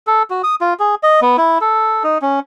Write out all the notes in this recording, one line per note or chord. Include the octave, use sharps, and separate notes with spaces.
A4
F#4
D#6
F4
G#4
D#5
B3
E4
A4
D#4
C#4